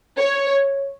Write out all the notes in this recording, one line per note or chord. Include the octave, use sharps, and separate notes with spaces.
C#5